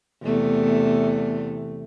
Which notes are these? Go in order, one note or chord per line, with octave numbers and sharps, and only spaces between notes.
E2 C3 A3